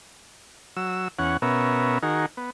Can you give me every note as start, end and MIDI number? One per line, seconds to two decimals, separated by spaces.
0.76 1.08 54
0.76 1.08 88
1.19 1.37 40
1.19 1.37 61
1.19 1.37 78
1.42 1.98 47
1.42 1.98 59
1.42 1.98 61
1.42 1.98 70
1.42 1.98 76
2.03 2.26 51
2.03 2.26 63
2.03 2.26 66
2.03 2.26 68
2.03 2.26 70
2.37 2.50 59